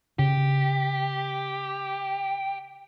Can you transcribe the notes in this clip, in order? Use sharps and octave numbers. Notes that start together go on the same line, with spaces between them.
C#3 G4